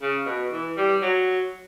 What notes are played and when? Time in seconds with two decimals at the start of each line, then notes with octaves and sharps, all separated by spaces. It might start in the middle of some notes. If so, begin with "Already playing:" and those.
0.02 C#3
0.26 B2
0.52 E3
0.77 G3
1.02 F#3